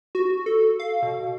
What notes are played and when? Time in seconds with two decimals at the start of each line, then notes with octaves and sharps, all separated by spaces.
0.15 F#4
0.46 A4
0.79 F5
1.02 B2